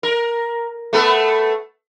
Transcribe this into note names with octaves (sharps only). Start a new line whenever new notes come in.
A#4
A3 B3 A4